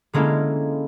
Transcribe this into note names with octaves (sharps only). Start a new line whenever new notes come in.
D3 G#3 A#3 C#4 E4